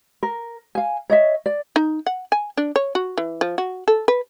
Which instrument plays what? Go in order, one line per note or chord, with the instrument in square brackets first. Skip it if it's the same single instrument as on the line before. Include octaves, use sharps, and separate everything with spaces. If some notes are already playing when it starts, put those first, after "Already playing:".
[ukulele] A#4
F5 G#5
C#5 D#5 E5
D5
[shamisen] D#4
F#5
G#5
D4
C#5
F#4
E3
F3
F#4
A4
B4